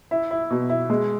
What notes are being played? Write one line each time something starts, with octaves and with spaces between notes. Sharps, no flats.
E4
E4
B2
E4
G#3